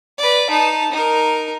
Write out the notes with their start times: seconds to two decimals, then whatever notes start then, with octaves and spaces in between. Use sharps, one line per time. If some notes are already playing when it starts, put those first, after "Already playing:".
0.18 B4 D5
0.50 D#4 A5
0.92 D#4 A#4